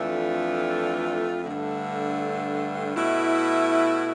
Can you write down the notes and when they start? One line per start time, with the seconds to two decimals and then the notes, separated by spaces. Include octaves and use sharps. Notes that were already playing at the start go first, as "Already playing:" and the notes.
Already playing: F2 E3 A3 D4 F4
1.44 G2 D3 A3
2.95 B2 A3 E4